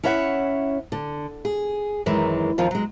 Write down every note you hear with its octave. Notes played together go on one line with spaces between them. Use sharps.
C#4 E4 C#5 E5 F#5
D3
G#4
F#2 D#3 E3 G#3
F2 D#3 F3 F4
F#3 G#3